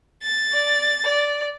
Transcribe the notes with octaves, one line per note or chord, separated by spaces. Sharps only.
A6
D5
D5